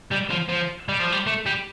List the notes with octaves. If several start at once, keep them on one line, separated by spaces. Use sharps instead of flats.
G3
F3
F3
G3
F3
G3
A3
G3